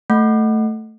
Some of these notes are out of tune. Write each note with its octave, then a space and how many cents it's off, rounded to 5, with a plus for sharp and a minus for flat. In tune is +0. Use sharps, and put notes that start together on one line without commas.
A3 +0 F#5 +0